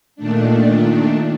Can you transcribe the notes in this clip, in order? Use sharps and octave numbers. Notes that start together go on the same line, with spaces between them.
A#2 D#3 A3 D4